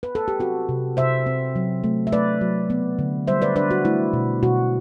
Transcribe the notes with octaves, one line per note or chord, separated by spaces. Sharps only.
B4
A4
G4
C4 F#4
C3
C3 C5 E5
C4
F#3
A3
E5
A3 B4 D5
F#3
B3
D3
G3 C5 E5
B4 D5
D4 B4 D5
F#4
A3 E4
B2
B2 F#4